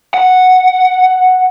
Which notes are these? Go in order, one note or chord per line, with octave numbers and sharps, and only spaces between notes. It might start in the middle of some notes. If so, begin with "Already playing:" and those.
F#5